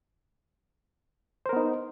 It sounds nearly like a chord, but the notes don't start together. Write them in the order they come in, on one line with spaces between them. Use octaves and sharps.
C5 A#4 B3 D#4